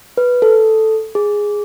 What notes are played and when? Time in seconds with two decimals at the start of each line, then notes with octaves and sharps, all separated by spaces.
0.17 B4
0.42 A4
1.15 G#4